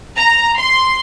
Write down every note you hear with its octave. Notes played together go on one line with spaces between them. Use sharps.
A#5
C6